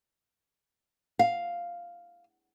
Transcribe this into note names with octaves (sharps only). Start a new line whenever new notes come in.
F5